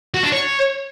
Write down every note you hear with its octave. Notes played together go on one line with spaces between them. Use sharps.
F#4
D4
C#5